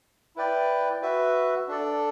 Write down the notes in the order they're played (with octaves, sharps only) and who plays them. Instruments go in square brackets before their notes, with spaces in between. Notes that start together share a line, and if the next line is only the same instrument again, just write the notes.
[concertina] E4 B4 D5 G5
F#4 B4 E5
D4 A4 D5